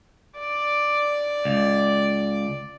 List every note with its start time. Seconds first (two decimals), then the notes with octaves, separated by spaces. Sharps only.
0.39 D5
1.45 C#2